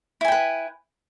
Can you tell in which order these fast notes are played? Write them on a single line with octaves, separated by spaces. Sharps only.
E4 G#5 G5 B4